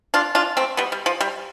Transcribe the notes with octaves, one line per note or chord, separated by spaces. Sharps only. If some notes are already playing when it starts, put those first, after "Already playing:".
D4 F4
D4 F4
A3 C4
G3 B3
G3
F3
G3